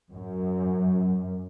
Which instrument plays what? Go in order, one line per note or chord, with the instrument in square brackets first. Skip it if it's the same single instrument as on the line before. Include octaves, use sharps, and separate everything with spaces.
[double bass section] F#2